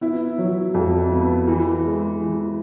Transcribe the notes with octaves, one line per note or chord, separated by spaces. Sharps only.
B3 E4
F#3
F2
B3
E3
G#3
E3